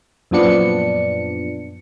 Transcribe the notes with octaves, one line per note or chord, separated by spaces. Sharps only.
F#2 A#2 F3 B3 D4 C#7